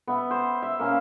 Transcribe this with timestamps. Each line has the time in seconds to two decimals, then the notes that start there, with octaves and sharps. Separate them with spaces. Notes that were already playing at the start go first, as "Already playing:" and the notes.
0.07 B3 E5
0.31 C5
0.63 E5
0.80 A#3 C#4 F5